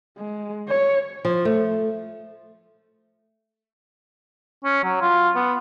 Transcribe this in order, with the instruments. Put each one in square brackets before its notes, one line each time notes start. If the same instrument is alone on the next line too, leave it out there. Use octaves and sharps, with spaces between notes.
[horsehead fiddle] G#3
C#5
[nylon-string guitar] F3
A3
[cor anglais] C#4
F#3
F4
B3